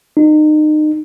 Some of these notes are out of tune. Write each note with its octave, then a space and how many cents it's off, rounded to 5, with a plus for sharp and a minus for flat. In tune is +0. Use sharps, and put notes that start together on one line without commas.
D#4 -30